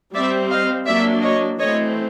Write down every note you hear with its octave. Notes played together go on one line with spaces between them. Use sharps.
G3 C4 D5 E5
D#5 F5
F#3 A#3 D4 D5 E5
C#5 D#5
E3 A3 C4 C#5 D#5